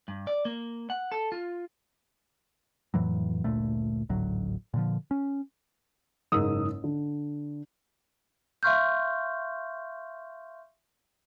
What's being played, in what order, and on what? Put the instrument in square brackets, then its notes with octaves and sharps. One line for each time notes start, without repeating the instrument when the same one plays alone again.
[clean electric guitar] G2
D5
A#3
F#5
A4
F4
[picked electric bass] F2 A2 E3 F#3
G1 D2 A#2 A3
G#1 D2 A2 F#3
A#2 D3 F3
C#4
[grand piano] F#1 G#2 A#4 D#6 E6
D3
[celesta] E5 F5 C6 C#6 F6 G6